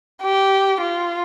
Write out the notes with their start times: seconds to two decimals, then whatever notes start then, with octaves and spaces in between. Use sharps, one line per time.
0.22 G4
0.81 F4